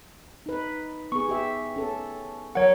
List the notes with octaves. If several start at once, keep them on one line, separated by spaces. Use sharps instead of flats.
D#4 B4
B3 G#4 C#6
G4 E5
C#4 A4
F#3 A#4 C#5 F#5